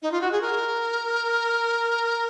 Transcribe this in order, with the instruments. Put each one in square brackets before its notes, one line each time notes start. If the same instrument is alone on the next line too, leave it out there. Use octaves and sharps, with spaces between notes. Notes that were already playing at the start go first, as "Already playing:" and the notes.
[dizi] D#4
F4
F#4
G#4
A#4